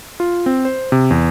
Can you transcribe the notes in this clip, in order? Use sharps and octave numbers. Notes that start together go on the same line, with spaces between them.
F4
C4
C5
C3
E2